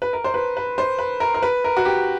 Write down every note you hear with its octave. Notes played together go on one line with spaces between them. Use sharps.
B4
A#4
C5
B4
B4
C5
B4
A#4
A#4
B4
A#4
F#4
G4